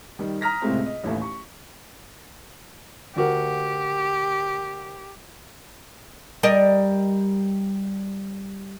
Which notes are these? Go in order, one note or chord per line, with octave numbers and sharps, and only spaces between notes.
D#3 G3
A#5 D#6 F6 A#6 B6
C#2 A2 C3 G#3 A3 C4
D#5
A1 D#2 A3
C#6
D2 F#4 G4 A#4
G3 A#4 D#5